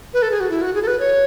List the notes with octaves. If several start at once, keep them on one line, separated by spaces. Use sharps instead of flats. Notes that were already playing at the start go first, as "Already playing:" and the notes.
B4
A4
G#4
F#4
E4
F#4
G#4
A4
B4
C#5